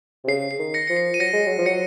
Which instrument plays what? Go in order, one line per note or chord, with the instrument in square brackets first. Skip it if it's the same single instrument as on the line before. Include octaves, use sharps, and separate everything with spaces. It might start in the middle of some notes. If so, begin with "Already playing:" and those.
[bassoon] C3
[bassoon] C#3 [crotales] C7
[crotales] C7
[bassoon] D#3
[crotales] A#6 C#7
[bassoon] F3 [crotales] C#7
[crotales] C7
D#7
[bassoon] F#3 [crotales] A#6 C#7
[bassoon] G#3
F#3
F3
[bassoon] F#3 [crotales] A#6 C#7